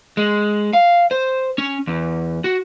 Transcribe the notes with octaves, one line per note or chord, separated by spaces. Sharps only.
G#3
F5
C5
C#4
E2
F#4